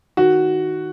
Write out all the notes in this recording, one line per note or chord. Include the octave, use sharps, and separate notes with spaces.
D#3 F#4